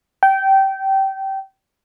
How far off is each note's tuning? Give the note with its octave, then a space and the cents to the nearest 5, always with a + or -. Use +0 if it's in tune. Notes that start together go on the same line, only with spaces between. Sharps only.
G5 -20